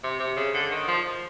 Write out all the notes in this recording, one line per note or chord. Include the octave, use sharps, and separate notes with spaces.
C3
C3
C#3
D3
D#3
F3